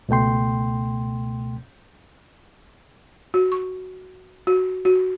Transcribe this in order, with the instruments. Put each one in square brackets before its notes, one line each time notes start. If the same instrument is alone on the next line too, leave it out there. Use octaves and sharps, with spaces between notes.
[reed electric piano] C#2 B2 A3 G5 C6
[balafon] F#4
C#6
F#4
F#4